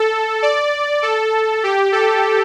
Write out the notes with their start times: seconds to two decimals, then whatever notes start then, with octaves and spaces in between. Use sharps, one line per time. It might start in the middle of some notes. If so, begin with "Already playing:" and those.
Already playing: A4
0.42 D5
1.03 A4
1.63 G4
1.92 A4